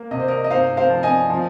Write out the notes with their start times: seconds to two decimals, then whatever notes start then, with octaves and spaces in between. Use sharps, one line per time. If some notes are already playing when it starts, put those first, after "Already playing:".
Already playing: A#3
0.11 C3 D#5
0.20 C5
0.28 A#4 D#5
0.44 D#5
0.50 D#4 C5 F5
0.77 C5 F5
0.90 F3
1.03 D#5 G#5
1.30 F3